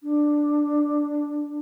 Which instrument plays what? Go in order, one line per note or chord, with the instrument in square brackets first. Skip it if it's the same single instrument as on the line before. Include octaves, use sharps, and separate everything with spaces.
[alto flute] D4